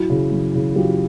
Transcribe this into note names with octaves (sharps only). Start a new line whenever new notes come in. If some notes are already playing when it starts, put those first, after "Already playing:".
Already playing: F#2 E4 F#4
C#3 E3
F#2
C#3 E3
F#2 F4 G4